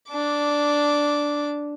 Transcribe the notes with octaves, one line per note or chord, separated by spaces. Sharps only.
D4 D6